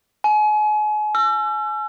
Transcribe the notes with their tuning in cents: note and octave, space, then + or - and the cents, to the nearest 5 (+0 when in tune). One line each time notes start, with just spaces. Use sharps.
G#5 +35
E6 +40